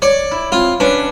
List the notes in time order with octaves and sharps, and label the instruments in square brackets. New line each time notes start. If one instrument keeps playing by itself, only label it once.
[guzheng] C#5 [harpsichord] D5
[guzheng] E4
[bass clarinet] C4 [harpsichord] F4
[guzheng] C#4 [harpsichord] D4 [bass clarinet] B4